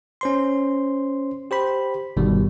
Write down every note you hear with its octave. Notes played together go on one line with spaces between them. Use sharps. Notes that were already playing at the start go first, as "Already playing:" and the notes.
C#4 C5 C6
G4 C5 B5
G1 B2 D#3 G3